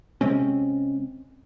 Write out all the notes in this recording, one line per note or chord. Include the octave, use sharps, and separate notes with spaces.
C3 G#3 C4 C#4